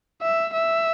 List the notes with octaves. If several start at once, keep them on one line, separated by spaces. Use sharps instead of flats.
E5
E5